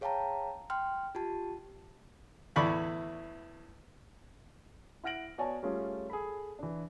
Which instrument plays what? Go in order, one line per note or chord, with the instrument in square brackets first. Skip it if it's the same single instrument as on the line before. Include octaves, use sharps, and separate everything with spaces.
[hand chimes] G#4 C#5 F5 G5 A5 A#5
G5 C6 F6
F4 G4 A5
[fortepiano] E2 A2 D5 B5 C#6
[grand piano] E4 F#5 F6 A#6 D7 F#7
B3 F#4 C#5 D5 G#5 A5
G3 A3 C#4 F4 G#4
G#4 A4 B5
E3 D4